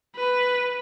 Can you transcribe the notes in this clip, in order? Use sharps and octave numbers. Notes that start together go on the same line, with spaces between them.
B4